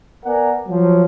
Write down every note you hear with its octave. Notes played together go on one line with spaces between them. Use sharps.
B3 A#4 D5 F#5 G#5 A#5
F3 F#3